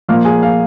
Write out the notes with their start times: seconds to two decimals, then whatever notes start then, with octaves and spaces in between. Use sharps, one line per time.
0.09 A#2 F3 A#3 F5 F6
0.25 G#4 G#5
0.43 F5